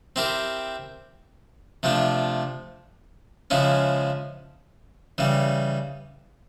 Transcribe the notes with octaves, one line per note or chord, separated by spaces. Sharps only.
C4 E4 G4 A#4
C3 F3 A3 D4
C#3 F3 G#3 C#4 E4
C#3 E3 G3